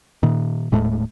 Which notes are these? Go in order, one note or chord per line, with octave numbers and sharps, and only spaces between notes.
A#2 D#3
D#1 A2 G#3 A3